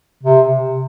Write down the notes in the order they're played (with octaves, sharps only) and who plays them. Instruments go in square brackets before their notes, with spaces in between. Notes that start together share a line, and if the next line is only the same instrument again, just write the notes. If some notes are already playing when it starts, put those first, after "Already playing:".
[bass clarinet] C3